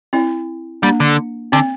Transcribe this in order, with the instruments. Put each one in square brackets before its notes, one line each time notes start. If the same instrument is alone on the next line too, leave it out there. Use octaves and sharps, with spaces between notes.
[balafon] C4 E4
[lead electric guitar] G3 [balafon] A#3 D4
[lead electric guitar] D3
[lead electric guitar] D3 [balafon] C4